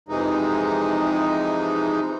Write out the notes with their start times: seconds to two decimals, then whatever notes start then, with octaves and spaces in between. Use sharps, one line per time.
0.09 F2 C3 E3 G#3 D#4